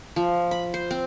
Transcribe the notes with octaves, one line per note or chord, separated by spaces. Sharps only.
F3
B5
C5
C4